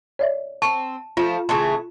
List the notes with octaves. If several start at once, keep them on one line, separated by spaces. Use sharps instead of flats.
C#5 D5 E5
C4 A5 C#6
F3 A3 F4
C#3 E3 A3 A5 C6